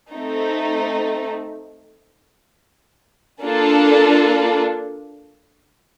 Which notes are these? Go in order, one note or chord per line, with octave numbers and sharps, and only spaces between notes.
A3 C4 D#4
A#3 D4 F4 A4